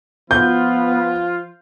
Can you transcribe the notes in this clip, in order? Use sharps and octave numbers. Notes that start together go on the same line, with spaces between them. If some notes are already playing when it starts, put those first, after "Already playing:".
F3 B3 F4 G6